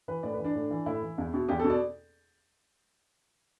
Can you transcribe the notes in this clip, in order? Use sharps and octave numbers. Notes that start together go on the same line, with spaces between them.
E3 B4
A2 D5
B4
E3
D4
A2
E3
A2 E4
E3
E2
B2
E2 G4
B2 A4
D5